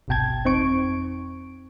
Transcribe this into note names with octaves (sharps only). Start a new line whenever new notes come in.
G1 C2 B2 G5 A5 G#6
F2 C4 D#4 C5 C#6 D7